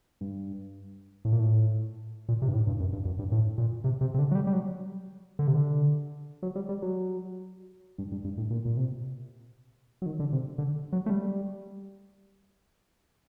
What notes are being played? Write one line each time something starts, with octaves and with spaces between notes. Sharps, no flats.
G2
A2
A#2
A2
A#2
C3
G2
A2
G2
F#2
G2
F#2
G2
A2
A#2
C3
C3
C3
D3
F#3
G3
G3
F#3
D3
C3
D3
F#3
G3
G3
F#3
G2
G2
G2
A2
A#2
A#2
C3
F#3
D#3
D3
C3
D3
F#3
A3
G3